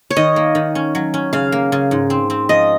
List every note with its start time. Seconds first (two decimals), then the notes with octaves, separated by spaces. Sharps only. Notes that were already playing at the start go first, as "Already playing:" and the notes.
0.10 C#5
0.16 D#3 D#5
0.36 A#3
0.55 D#3
0.75 C#4
0.95 F#3
1.14 C#4
1.33 C#3 F5
1.52 A#3
1.72 C#3
1.91 G#2
2.10 C4
2.30 C4
2.49 F3 D#5